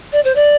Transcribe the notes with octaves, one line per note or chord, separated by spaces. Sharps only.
D5
C5
D5